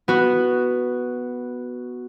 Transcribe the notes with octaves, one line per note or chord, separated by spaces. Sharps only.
B3 F#4